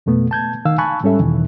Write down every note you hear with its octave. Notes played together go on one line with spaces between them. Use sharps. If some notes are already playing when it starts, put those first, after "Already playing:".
F2 B2 A3 B3
A5 G6 G#6
D#3 F5 E6
G#5 A5 B5 C#6 F#6
G#2 G3 C#4 A4 E5
E2 B2 D#3 E3